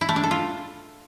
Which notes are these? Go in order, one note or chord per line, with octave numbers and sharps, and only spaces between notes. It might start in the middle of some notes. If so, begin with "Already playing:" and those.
E4
A3
D4
A4
F4